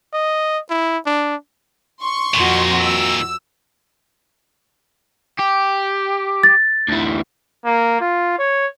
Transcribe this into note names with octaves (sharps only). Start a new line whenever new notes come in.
D#5
E4
D4
C6 C#6
F2 A#2 D#3 F#4
E6
G4
A6
D2 E3
A#3
F4
C#5